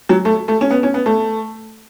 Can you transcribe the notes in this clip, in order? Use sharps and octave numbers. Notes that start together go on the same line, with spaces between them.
F#3
A3
A3
C#4
B3
C#4
B3
A3